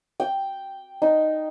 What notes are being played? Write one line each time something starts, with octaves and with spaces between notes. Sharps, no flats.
G5
D#4